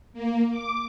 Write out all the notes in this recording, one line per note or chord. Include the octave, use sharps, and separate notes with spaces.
A#3
D6